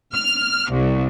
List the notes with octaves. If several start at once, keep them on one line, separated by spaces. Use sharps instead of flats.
F6
C2